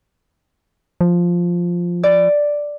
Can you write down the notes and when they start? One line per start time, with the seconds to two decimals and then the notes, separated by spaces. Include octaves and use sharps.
1.01 F3
2.03 D5